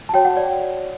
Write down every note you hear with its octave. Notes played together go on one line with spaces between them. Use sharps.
A5
F#4 C#5 G5
F#5
D5